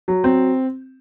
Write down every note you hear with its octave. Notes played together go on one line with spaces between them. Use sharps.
F#3
C4